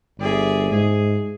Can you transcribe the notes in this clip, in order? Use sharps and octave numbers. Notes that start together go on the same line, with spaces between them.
G1 G#4 D5 E5
G#2 G#4